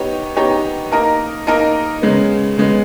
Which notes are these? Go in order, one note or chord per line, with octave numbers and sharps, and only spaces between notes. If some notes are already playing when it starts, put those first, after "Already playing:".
Already playing: B3 D#4 G4 C#5
B3 D#4 G4 C#5
A#3 D#4 A#4 D#5
A#3 D#4 A#4 D#5
C#3 G#3 B3
C#3 G#3 B3